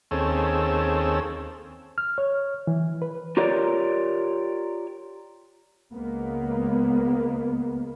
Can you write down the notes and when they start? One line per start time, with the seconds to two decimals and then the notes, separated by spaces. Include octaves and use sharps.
0.11 D#2 C4 C#4 G#4 A4 E6
1.98 F6
2.18 C#5
2.67 E3
3.02 B4
3.37 F4 G4 A#4 C#5 D5
5.93 C#2 G#3 A#3 B3